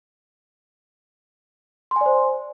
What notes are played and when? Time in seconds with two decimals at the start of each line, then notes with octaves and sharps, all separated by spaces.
1.91 C6
1.96 G#5
2.01 D5
2.06 C5